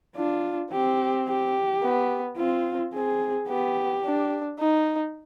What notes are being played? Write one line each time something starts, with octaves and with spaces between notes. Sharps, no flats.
D4 F4
C4 G4
G4
B3
C4 F4
C4 G#4
B3 G4
D4
D#4